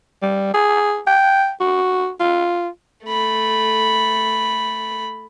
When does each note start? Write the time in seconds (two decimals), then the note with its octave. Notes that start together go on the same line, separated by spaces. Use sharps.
0.22 G3
0.54 G#4
1.07 G5
1.61 F#4
2.20 F4
3.05 A3 B5